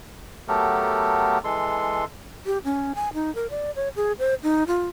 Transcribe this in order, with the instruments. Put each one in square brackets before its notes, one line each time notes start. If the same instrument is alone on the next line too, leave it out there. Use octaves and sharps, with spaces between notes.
[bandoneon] F#3 A3 B3 G4 A4 A#4
E3 G#3 A4 C6
[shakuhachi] G4
C#4
G#5
D#4
A#4
D5
C#5
G#4
C5
D#4
F4